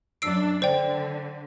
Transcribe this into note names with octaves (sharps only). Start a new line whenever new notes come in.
F#2 D4 E6 C7 D7
D3 C5 D5 G5